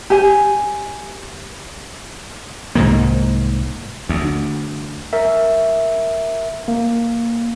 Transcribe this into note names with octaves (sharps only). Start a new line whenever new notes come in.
G4 G#5
C2 G#2 D#3 A#3
D2
A#4 E5
A#3